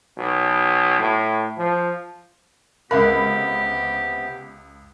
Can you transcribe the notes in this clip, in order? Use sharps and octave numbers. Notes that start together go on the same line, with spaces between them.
B1
A2
F3
C#2 C3 B3 G4 A#4 F5 B5